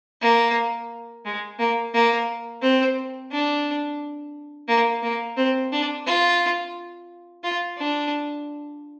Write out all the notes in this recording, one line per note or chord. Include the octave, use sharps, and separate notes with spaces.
A#3
G#3
A#3
A#3
C4
D4
A#3
A#3
C4
D4
F4
F4
D4